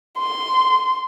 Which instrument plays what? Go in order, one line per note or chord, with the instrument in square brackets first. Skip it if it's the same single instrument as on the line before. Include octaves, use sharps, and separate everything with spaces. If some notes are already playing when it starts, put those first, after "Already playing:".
[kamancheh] C6